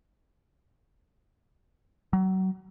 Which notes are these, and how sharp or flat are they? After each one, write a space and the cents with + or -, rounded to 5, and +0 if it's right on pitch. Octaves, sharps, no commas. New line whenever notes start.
F#3 +30